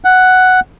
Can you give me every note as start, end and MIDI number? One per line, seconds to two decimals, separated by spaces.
0.04 0.60 78